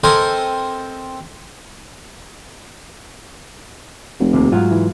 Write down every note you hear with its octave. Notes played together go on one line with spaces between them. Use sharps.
C4 A4 A#4 C5 D#5 G#5
F1
D#2 C3
G#2 F#3 F4
E3